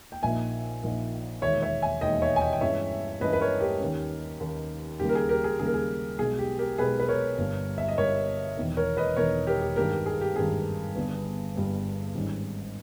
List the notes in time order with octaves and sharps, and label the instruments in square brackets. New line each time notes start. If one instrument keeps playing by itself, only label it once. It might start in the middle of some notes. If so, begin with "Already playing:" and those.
[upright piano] G5
A#1 A#2 A#3 D#4 E5 G#5
A#1 A#2 A#3 D#4
E1 D#2 D#3 G#3 C#5 E5
C#5 E5
E5 G#5
E1 D#2 D#3 G#3 D#5 G5
C#5 E5
G#5
D#5 G5
G5
G2 E3 G#3 C#4 C#5 E5
G2 E3 G#3 C#4 B4 D#5
B4
A#4 C#5
G4 A#4
D#2 D#3 A#3 C#4
D#2 D#3 A#3 C#4
D#2 C#3 G3 A#3 G4
A#4
G#4
G4 A#4
G#4
D#2 C#3 G3 A#3 G#4
A#4
G#4
B1 B2 G#3 G#4
G4
G4 A#4
B1 B2 G#3 G#4 B4
B4
A#4 C#5
G1 G2 G3
E5
D#5
G1 G2 G3 A#4 C#5
E1 E2 D#3
A#4 C#5
B4 D#5
E1 E2 D#3 A#4 C#5
G4 A#4
G4
G#1 G2 D#3 G#3 B3 G4 A#4
G4
G#4
G4
G#1 G2 D#3 G#3 B3 G#4
G1 G2 G3 B3
G1 G2 G3 B3
G#1 G#2 G3 C#4